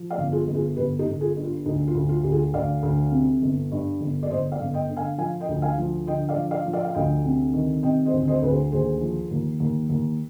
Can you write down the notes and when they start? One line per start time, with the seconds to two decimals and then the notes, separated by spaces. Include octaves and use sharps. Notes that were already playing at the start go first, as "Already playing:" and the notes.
Already playing: F3
0.10 D5 F5
0.18 G1
0.32 F4 G#4
0.47 G1
0.54 F4 G#4
0.77 G1 G4 B4
0.99 D#4 G4
1.06 G1
1.21 F4 G#4
1.36 G2
1.43 F4
1.66 D2 D#4
1.87 F4
1.95 D2
2.09 F4
2.24 D2 G4
2.32 F4 G#4
2.54 D2 D5 F5
2.83 D2
3.12 C3
3.42 G1
3.72 G2
4.01 G1
4.23 D5
4.30 G1 C5 D#5
4.52 D5 F5
4.60 G1
4.74 D#5 G5
4.89 D3
4.96 F5 G#5
5.18 F3 F5 G#5
5.40 D#5 G5
5.48 D2
5.62 F5 G#5
5.78 F3
6.07 D3 D#5 G5
6.29 D5 F5
6.36 F3
6.51 D5 F5
6.65 F3
6.73 D5 F5
6.85 F5
6.95 D2 D#5 G5
7.25 C3
7.54 D#3
7.83 C3 D#5 G5
8.05 C5 D#5
8.13 D2
8.28 C5 D#5
8.42 D2 B4
8.49 G#4 C5
8.72 D#2 G#4 C5
9.01 F3
9.31 D#2
9.60 D#2
9.89 D#2